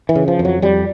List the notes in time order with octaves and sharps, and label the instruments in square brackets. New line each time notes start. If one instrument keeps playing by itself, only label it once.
[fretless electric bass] E3
C#3
F3
F2
F#3
F2 G3